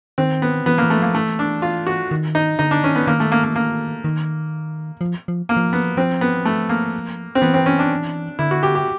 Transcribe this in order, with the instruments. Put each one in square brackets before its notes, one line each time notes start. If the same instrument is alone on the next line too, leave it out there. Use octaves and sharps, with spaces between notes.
[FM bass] D#3 [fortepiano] C4
[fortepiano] B3
[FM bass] E3 [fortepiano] B3
[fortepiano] A#3
[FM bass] E3
[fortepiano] A3
[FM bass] F3 [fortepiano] A#3
[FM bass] E3 [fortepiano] A3
[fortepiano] D4
F4
F#4
[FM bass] D#3
[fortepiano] D#4
[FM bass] D3 [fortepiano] D#4
[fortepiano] D4
[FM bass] D#3 [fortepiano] C#4
[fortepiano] B3
[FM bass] D#3 [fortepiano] A#3
[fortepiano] A3
A#3
A#3
A#3
[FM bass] D#3
F3
F3
[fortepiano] A#3
[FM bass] F3
[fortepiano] B3
[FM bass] F3 [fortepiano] C4
[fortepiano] B3
A3
A#3
C4
[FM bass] E3 [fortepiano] B3
[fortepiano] C4
C#4
D4
[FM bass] D3 [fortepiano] E4
[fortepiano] F#4
G4
G4